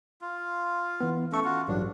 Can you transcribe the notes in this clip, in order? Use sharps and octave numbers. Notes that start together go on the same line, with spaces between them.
F4
E3 B3
A3 C#4 A4 C#6
F4 F#4
A1 G2 F#3 D4